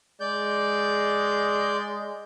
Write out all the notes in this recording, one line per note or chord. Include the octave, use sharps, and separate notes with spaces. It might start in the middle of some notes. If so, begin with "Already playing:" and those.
G#3 D5 G6